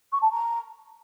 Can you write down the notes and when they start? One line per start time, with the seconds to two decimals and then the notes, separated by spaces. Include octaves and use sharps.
0.12 C#6
0.22 A5
0.31 A#5